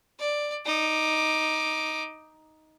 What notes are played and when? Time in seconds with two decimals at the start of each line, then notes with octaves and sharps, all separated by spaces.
0.19 D5
0.66 D#4 D6